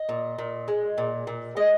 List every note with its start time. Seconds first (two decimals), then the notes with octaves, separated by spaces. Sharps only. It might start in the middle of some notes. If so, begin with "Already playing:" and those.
Already playing: D#5
0.09 A#2
0.38 A#2
0.68 G#3
0.98 A#2
1.27 A#2
1.56 G#3 D#5